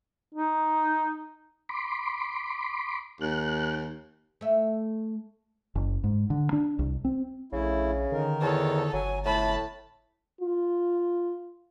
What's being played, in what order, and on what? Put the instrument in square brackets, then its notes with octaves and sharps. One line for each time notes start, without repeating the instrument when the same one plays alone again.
[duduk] D#4
[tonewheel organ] B5 C6 D6
[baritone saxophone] D#2 [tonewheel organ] F#6
[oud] A3 E5
[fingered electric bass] F#1
G#2
D3
D4
C2
C4
[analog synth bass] A#1 [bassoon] C#3 [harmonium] A3 E4
[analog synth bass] D3 [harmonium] D#3 D#4 A#4
[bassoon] E2 [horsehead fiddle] A4 C#5
[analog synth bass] G1 [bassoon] F#3 [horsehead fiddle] G#5
[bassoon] A2 [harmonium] A3 [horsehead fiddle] A5 B5
[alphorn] F4